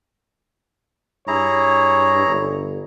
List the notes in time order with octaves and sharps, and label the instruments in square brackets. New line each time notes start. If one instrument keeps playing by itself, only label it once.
[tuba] G2 [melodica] E4 G#4 A#5 [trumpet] C#5
[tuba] G1